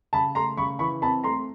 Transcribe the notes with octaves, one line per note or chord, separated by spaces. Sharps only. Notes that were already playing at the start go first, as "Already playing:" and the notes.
C#3 A5 B5
A3 A#5 C6
C#3 B5 C#6
E3 B5 C#6
C4 A5 B5
A3 A#5 C6